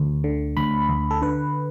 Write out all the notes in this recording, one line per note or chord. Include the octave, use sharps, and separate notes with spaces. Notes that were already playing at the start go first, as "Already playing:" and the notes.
Already playing: D2
D3
D2 B5
D2
A4
D3 B4